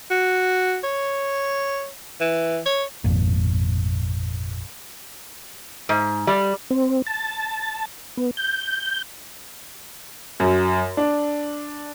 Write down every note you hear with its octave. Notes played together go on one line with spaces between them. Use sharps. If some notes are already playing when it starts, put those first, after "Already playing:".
F#4
C#5
E3
C#5
G#1 F2 A#2
G#2
G3
C4
A5
B3
G6
F#2
D4